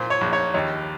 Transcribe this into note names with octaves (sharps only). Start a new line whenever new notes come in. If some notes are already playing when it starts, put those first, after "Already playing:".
Already playing: A#2 C5
C#5
A#1
C#5
D#2 C#5